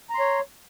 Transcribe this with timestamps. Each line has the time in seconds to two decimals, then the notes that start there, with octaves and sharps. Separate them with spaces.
0.10 A#5
0.15 C6
0.19 C#5